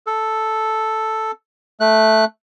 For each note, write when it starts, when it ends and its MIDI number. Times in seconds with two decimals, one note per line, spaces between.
0.07 1.31 69
1.80 2.25 57
1.80 2.25 90